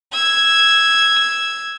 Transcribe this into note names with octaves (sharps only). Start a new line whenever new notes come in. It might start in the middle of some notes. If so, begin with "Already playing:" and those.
E6 G#6